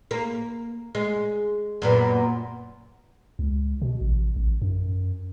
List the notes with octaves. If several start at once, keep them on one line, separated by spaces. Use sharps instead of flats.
A#3
G#3
F#2 A#2 B3
C#2
B2
A1
A1
F#2